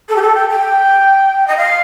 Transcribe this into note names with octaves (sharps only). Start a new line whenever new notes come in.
A4
G4
A4
G5
G5
D#5
F5